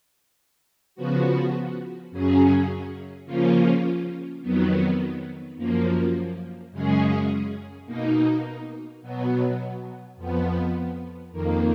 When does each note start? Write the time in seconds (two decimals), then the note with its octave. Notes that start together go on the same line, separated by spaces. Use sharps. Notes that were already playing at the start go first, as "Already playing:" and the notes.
0.95 C#3 F3 B3 F#4
2.11 F#2 C#3 F#3 C#4 G#4
3.25 C#3 F3 A#3 C#4 F4
4.42 F2 D#3 F#3 B3
5.57 F#2 F3 A#3
6.71 F#2 C#3 G#3 C#4 G#4
7.86 B2 A#3 D#4
9.02 B2 F#3 B3
10.16 F2 F3 B3
11.32 F2 D#3 A#3